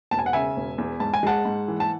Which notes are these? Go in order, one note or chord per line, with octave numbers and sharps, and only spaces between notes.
E1 A5
G#5
F#5
C#3 E5 G#5
E1
E2
G#2 A5
G#5
G#3 F#5 A5
G#2
E3
A5